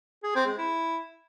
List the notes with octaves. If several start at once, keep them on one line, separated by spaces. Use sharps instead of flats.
G#4
C4
G#3
E4